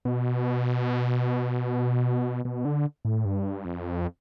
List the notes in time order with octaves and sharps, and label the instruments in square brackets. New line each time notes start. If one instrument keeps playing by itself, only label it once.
[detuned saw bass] B2
B2
D3
A2
G2
F2